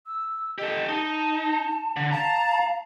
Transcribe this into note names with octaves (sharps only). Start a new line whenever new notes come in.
E6
G4 A4 D#5
D#4 A5
D3
F5 A5 A#5